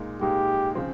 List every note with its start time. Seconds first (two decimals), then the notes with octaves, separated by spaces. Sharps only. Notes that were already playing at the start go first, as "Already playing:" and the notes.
Already playing: A#2 G#3 D#4
0.21 A#2 G#3 D#4 G4
0.75 C#3 F3 C4